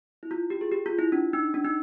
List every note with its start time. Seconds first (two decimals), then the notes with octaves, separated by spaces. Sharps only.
0.23 E4
0.31 F4
0.50 G4
0.61 G#4
0.72 G4
0.86 F4
0.98 E4
1.12 D4
1.33 D#4
1.54 D4
1.64 D#4